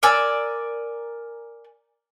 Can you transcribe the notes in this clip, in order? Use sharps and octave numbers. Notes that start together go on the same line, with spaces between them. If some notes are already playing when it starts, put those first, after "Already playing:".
A#4 D5 G#5 E6